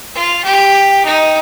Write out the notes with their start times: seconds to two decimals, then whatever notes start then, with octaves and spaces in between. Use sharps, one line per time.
0.15 F4
0.44 G4
1.05 D#4